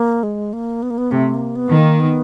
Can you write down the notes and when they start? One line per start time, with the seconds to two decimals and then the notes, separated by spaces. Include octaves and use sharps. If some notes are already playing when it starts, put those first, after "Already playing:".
Already playing: A#3
0.23 G#3
0.53 A#3
0.83 B3
0.90 A#3
0.98 B3
1.11 C3 A3
1.35 A#3
1.56 B3
1.71 D#3
1.78 A#3
2.00 B3